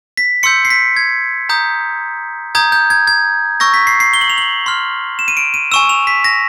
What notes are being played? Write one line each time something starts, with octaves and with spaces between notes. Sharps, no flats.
B6
C6 E6 G6 C#7
C7
B6
G#6
A#5 D#6 G6
A#5 D#6 G6 G#6
G6
G#6
G#6
C#6 E6 G6 A#6
B6
C7
C7
G7
F#7
F7
F#7
C6 F6
E7
D#7
D7
D#7
G#5 C#6 E6 E7
F7
B6
A#6